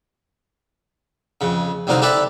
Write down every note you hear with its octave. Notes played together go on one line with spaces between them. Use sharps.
F2 C#3
C2 D3 F#3 C4 D#4 F5
G4 A4 B4 D5 E5